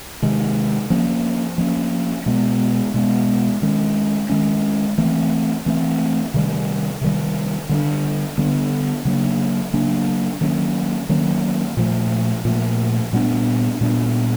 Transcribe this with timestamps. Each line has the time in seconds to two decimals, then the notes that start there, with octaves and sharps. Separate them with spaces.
0.22 C3 D#3 G#3
0.90 F3 A#3 C#4
1.58 F3 A#3 C#4
2.26 B2 G#3 B3
2.94 B2 G#3 B3
3.62 D#3 G#3 C#4
4.30 D#3 G#3 C#4
4.98 E3 A3 C4
5.66 E3 A3 C4
6.34 C3 D#3 G3
7.01 C3 D#3 G3
7.69 D3 G3 B3 D4
8.38 D3 G3 B3 D4
9.05 C#3 F#3 A#3 D4
9.73 C#3 F#3 A#3 D4
10.41 D#3 F#3 A#3 C#4
11.09 D#3 F#3 A#3 C#4
11.77 A#2 F3 A3
12.45 A#2 F3 A3
13.13 A#2 G3 B3 D4
13.81 A#2 G3 B3 D4